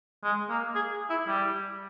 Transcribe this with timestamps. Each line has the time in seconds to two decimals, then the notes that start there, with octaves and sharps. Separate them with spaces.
0.24 G#3
0.49 A#3
0.75 G#4
1.10 E4
1.27 G3